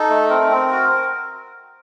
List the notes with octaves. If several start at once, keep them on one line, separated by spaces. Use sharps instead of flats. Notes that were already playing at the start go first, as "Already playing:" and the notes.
Already playing: D#4 A4
A3
C4 A#4
C4
F#4